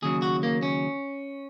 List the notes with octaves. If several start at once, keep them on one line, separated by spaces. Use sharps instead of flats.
D#2 C#3 F#3 G#4
F#4
A#3
C#4